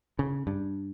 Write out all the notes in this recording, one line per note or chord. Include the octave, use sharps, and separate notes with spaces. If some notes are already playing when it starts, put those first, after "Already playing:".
C#3
G2